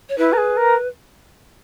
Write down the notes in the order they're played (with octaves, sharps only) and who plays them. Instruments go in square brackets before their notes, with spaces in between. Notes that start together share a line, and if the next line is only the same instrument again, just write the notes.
[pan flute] C#5
[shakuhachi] E4 [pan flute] B4
[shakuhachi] A#4
G#4
A#4